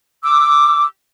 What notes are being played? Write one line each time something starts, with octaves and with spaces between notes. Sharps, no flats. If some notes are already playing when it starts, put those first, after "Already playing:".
D6 E6